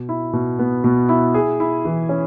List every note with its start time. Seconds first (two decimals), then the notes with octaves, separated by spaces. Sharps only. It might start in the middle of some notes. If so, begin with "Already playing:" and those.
Already playing: B2
0.09 E4
0.33 B2
0.59 B3
0.84 B2
1.09 E4
1.34 G#4
1.60 E4
1.85 E3
2.09 C#4